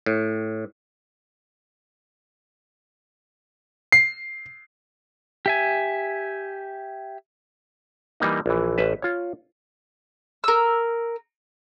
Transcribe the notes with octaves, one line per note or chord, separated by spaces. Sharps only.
A2
C7
G4 E5 G#5
E3 G3 A#3 D#4
A#1 E3
A1 B4 E5
F4 C#5
A#4 E6